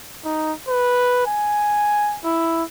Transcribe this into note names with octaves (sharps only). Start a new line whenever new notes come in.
D#4
B4
G#5
E4